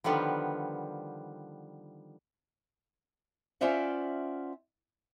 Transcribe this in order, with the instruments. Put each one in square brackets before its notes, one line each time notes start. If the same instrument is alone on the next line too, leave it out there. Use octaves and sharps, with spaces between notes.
[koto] D3 D#3 F3 G3 B3
[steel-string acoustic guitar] C#4 F4 C5 D5 E5 F#5